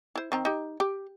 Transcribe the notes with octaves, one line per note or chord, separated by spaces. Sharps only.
E4 C5
D#3 C4 A#5
D#4 G4
G4